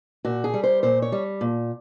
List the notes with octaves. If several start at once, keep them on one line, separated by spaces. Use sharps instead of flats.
A#2 F#4
G#4
G3
C5
A#2 C5
C#5
G3
A#2